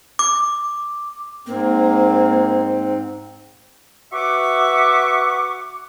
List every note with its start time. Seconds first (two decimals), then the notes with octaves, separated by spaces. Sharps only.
0.19 D6
1.47 G#2 A#3 C4
4.13 F#4 B4 E5 C#6 D6